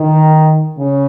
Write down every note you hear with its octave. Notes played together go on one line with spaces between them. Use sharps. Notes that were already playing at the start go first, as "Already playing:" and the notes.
Already playing: D#3
C#3